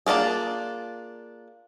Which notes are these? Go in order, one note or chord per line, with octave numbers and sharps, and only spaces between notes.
A#3 D4 F4 G#4